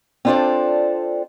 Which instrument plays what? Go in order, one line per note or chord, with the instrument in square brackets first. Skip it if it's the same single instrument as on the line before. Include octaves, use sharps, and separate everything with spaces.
[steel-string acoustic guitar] C4 D4 F4 A4 C5 D5